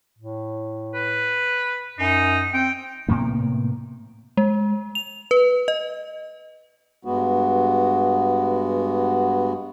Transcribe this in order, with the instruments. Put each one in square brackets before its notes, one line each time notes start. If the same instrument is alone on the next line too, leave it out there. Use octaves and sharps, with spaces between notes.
[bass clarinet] A2
[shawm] B4
[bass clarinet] F#2 [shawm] D#4
[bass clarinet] C4 [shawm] G5
[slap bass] A2 C3 A#3 B3
[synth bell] G#3
F7
B4
D#5
[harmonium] G2 G#3 B3 F#4